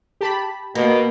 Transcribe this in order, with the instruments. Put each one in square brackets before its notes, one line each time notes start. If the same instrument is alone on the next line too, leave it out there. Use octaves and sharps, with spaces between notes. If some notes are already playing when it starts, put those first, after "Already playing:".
[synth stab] G4 A5 B5
[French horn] B2 [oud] A#3